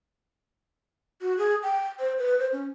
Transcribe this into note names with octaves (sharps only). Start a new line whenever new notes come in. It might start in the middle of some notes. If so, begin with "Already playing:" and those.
F#4
G#4
G5
C5
B4
C5
C#4